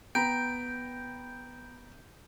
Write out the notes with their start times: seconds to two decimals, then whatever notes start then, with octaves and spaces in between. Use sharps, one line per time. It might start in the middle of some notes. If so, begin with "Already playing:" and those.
0.15 B3 G5 A#5 B5 G6 D7